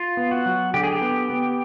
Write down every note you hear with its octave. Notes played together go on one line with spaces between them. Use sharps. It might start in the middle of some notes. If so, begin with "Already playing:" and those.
Already playing: F4
B3
F#4
F#3
D3 G4
G#4
G4
B3
B3